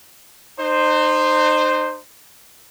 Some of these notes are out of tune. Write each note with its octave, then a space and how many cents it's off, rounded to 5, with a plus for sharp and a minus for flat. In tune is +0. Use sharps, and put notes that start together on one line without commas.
D#4 -35 C5 +0